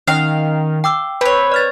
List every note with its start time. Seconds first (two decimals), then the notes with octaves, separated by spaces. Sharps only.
0.08 D#3 C#4 F5 G5 F6
0.84 G5 D6 E6
1.21 C4 B4 C#5
1.52 D5 F6 A6